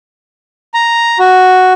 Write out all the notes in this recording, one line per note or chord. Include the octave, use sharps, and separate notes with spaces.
A#5
F#4